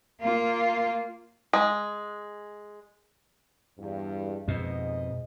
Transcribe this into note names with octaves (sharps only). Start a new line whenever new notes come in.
A#3 F4
G#3
E2 G2
F2 G#2 B2 D#5